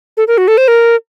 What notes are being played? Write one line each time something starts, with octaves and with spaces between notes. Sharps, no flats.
A4
A#4
F#4
A4
C5
A#4